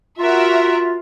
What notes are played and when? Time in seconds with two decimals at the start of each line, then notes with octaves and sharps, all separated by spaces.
0.19 F4 F#4 A#4 E5